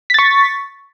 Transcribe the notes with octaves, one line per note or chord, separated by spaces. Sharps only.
C#6 A6 B6